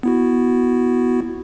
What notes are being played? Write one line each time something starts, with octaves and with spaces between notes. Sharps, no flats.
B3 E4 F#4